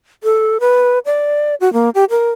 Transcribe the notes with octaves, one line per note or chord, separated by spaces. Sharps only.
A4
B4
D5
F#4
A#3
G4
A#4